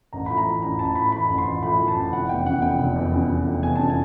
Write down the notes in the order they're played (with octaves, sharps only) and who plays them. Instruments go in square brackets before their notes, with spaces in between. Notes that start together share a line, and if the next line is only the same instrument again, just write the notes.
[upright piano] A1 A#5
A2 B5
A#5
E3
A1 A#5
A1 A5
A2 B5
E3 B5
A1
C6
A1
A2 B5
E3
A5
A1
F1 F#5
E2 G5
C#3 F#5
F1 G5
F1
E2
C#3
F1
F1
E2 G#5
C#3 A5
G#5